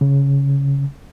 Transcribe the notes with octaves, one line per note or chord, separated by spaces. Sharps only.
C#3